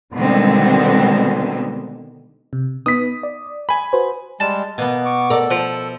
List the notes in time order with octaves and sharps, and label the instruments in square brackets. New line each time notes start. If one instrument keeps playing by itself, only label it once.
[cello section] B2 D3 D#3 G3 G#3 C4
[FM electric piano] C3
[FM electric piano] B3 D#4 B4 [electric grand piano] D#6 B6
[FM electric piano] D5
[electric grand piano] G#5 B5
[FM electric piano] F#4 B4 C5
[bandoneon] G3 G#3 [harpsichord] A5
[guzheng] B2 B3 [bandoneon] A#3
[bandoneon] C#6 D6
[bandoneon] A4 [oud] A#4 D5
[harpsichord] F3